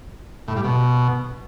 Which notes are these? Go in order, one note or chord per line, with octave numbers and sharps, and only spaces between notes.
A2
G3
B2